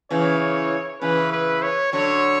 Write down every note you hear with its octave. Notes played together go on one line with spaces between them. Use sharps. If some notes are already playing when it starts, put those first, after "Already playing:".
C#3 E3 C#5
C#3 E3 B4
B4
C#5
D3 F#3 C#5